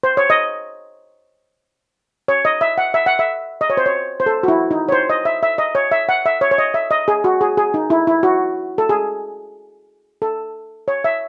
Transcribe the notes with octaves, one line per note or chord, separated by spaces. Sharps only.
C5
C#5
D#5
C#5
D#5
E5
F#5
E5
F#5
E5
D#5
C#5
C5
C#5
C5
A4
F#4
E4
D#4
C#5
C5
D#5
E5
E5
D#5
C#5
E5
F#5
E5
C#5
C#5
D#5
E5
D#5
G#4
F#4
G#4
G#4
D#4
E4
E4
F#4
A4
G#4
A4
C#5
E5